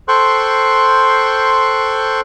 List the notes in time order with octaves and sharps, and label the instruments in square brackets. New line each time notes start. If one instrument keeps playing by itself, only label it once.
[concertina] A4 C5 G5 C6 C#6 F#6